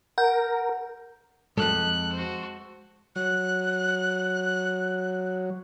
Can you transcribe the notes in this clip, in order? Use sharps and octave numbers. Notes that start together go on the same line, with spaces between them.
A#4 F#5 G6
F2 G#2 G#3 A4 F#6
F#4 C5
F#3 F#6